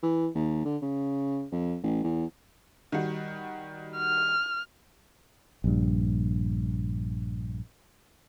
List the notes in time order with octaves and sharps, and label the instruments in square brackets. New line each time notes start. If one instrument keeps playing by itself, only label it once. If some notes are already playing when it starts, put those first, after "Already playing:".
[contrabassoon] E3
D#2
D3
C#3
F2
A1
E2
[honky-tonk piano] D#3 G3 F#4
[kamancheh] F6
[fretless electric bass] A#1 G2